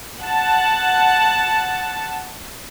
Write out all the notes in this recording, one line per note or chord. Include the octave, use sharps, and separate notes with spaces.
F#5 A5